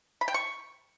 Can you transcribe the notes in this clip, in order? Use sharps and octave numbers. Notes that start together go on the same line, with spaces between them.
B5
G5
C#6